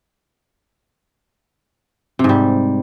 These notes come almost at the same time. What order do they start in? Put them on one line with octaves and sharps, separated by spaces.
C3 G#2 G3